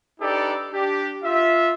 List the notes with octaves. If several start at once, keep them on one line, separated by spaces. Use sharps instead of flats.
D4 D#4 G4 A4 B4 D5
D4 G4
F4 E5